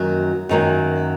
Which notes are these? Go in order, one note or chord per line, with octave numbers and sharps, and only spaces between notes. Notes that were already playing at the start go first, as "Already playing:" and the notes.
Already playing: F#2 D#3 F#3 A#3
F#2 D#3 F#3 A#3